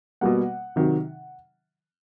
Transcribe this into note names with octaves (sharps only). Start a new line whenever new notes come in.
B2 G3 A#3 F#5
C3 D#3 F#3